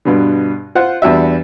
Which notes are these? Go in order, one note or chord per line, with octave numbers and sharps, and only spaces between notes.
G2 B2 D3
F4 C5 F#5
E2 G3 D4 F#4 E5